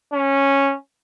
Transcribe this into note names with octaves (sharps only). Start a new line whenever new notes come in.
C#4